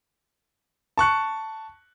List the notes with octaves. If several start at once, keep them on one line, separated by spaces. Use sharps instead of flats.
A5 C#6 F#6 C#7